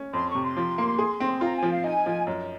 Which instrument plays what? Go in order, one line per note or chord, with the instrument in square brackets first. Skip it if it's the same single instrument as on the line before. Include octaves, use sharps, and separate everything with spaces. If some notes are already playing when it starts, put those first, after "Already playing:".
Already playing: [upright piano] C#4
[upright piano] F2 [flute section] C6
[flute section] C#6
[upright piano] C3
[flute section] C6
[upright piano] F3
A#3
G#4
C4
[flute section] C6
[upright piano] F4 [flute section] A#5
[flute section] G#5
[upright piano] F3
[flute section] F5
[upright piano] D#4 [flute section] G#5
[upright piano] F3
F#2